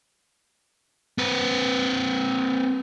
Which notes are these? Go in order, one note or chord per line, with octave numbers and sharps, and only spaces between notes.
C4 B4